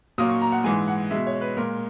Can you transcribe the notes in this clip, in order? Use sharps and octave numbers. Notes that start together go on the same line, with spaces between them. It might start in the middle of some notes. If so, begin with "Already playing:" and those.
A#2 F#3 A#3 D#6
C#6
A#5
F#5
G#2 E3 G#3 G#5
F#5
B2 G#3 E5
C#5
B4
A#2 G#3 A#4